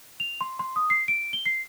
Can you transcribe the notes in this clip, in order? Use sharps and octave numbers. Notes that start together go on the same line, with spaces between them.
F7
C6
C6
D#6
C7
D7
G7
C7